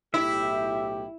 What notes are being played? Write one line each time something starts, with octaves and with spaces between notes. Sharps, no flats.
B1 A2 E4 G4 E5